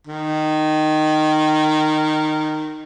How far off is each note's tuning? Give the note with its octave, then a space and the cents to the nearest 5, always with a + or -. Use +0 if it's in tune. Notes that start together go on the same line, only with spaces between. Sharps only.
D#3 -15